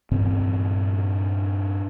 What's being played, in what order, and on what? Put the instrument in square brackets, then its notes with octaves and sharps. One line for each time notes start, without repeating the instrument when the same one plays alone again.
[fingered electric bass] G2 A#2 E3 C4